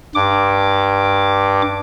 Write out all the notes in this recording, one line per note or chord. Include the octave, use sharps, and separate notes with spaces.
G2 D6